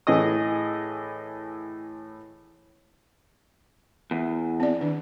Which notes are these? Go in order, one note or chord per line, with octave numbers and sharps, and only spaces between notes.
A2 E3 G#4 D#5 D#6
E2
C4 D5
D#3 D4